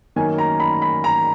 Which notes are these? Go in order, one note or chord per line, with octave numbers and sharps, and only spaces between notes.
F#2 D#3 A#3 C#4 G#5
A#5
B5
B5
A#5